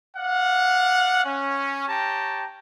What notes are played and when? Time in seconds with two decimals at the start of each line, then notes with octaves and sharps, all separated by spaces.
0.17 D5 F5 F#5
1.25 C#4
1.88 G4 C#5 G5 A5 A#5